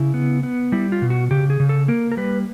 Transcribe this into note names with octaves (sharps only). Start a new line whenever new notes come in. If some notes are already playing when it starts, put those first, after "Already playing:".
Already playing: C#3 E4
B3
B3
G3 E4
F4
B2
F#4
C#3 G4
G#4
C#3
A4
A#3 A#4
A#4
G3 B4